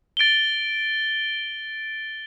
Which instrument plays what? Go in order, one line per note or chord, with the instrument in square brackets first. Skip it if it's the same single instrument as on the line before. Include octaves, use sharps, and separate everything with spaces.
[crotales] A6 D7 G7